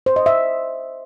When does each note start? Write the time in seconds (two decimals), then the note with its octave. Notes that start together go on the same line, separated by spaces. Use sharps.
0.06 C5
0.16 D#5
0.26 E5